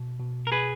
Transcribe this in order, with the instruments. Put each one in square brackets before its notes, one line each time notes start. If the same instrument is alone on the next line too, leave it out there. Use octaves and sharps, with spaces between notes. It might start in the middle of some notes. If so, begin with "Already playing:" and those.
Already playing: [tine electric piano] B2
B2
[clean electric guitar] A#4
G#4 B4